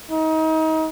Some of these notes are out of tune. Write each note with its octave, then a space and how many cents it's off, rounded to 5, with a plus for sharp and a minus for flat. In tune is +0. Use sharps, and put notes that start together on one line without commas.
D#4 +30